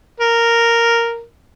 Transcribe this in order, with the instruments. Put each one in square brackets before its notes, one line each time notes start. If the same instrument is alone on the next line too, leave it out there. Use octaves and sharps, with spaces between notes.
[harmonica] A#4